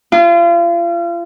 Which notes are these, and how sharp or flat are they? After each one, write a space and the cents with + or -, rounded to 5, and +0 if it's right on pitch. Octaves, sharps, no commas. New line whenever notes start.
F4 -35